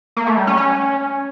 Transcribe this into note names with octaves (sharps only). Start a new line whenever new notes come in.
A#3
A3
G3
C#4
C#4